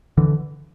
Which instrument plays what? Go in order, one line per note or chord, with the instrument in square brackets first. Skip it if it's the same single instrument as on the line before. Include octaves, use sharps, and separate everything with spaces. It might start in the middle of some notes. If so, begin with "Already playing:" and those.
[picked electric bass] D3 E3